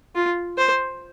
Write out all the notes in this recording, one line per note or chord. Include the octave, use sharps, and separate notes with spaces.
F4
C5